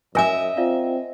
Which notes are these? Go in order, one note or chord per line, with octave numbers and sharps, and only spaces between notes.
F#2 A#4 D#5 E5 G#5
C4 F4 D5 F5